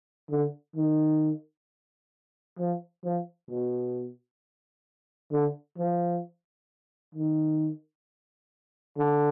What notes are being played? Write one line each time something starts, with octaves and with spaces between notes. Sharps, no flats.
D3
D#3
F3
F3
B2
D3
F3
D#3
D3